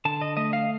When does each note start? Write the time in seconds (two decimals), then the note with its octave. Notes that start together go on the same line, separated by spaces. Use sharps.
0.05 D3 A5
0.21 D#5
0.37 A3 D#5
0.53 F5